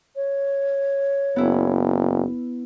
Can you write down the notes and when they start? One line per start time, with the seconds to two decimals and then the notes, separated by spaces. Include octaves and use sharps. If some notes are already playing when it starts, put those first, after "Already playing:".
0.16 C#5
1.36 F#1 B3 E4